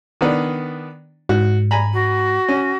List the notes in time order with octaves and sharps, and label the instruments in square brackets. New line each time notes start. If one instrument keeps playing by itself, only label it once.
[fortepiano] D#3 B3 D4
[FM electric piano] G#2 [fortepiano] F#4
[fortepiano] G#5 A#5 B5
[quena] F#4
[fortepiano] C#4